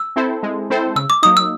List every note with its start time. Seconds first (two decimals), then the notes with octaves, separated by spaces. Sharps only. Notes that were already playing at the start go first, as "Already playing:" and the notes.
Already playing: E6
0.16 C4 E4 A4 C5
0.43 G#3
0.70 C4 E4 A4 C5
0.96 C#3 E6
1.10 D6
1.23 F#3 A#3 D#4 D#6
1.37 E6